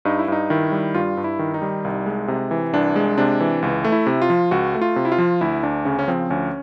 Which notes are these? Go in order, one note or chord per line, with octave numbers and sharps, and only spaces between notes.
G2 D#4
E4
G2 D#4
D#3 E4
G3
G2 F4
G2
E4
D#3
D#4
G3
C2
G#3
C3
E3
C2 D4
G#3
C3 D4
E3
C#2
A3
E4
C3
F4
F3
C#2 F#4
A3
F4
C3
E4
F4
F3
D2 E4
D2 D4
C#3 C#4
C#4
F3 C4
D2 C#4